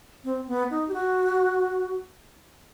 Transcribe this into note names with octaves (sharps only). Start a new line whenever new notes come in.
C4
B3
D#4
G4
F#4